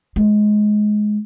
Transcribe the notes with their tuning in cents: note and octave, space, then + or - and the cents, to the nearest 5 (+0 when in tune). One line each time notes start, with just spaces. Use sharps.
G#3 +15